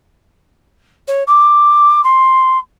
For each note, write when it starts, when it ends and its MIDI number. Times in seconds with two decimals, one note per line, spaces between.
1.07 1.23 73
1.27 2.03 86
2.03 2.58 84